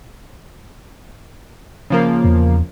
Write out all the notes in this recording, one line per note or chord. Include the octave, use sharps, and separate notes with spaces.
C#3 F3 A#3
E2